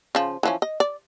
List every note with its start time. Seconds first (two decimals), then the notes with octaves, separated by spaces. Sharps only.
0.15 C#3 F3
0.43 E3 F3 C#4
0.62 D#5
0.80 D5